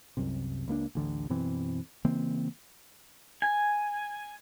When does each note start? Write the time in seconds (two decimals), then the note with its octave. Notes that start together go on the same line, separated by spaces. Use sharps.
0.17 C2 F#2 C3
0.68 C#2 A#3 D4
0.95 A1 D2 D3
1.29 F#2 B2 E3 C4
2.04 C#3 E3 A#3 C4
3.42 G#5